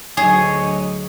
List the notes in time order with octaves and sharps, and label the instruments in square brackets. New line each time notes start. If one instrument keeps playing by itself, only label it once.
[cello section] D2 F#3 D#5 [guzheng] G#4 [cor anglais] C#5